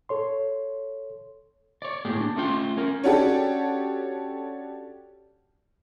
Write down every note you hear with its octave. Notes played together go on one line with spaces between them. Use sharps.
A4 C#5 C6
C#5 D5
A2 A#3 G4 G#4
D4
A3 C#4 F4 G5
C#4 A#4
C#4 D4 F#4 G4 A4